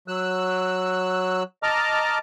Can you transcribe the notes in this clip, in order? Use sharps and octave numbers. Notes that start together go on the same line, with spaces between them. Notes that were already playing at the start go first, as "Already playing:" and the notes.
F#3 E6 F#6
D#5 A5 A#5 D6 F6